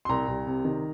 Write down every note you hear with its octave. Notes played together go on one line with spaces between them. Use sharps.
C6
C2 A#5
C2
C3
D#3